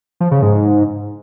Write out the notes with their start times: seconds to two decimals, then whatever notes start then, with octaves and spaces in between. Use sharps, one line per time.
0.20 F3
0.31 C#3
0.42 G#2